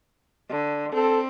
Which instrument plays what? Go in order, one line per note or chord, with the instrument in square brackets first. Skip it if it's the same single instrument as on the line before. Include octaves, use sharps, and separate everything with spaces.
[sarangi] D3
[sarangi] C4 [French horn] A4